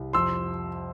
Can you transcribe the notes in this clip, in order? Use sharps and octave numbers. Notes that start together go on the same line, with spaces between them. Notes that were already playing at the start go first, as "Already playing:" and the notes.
Already playing: C2
F2 C6 E6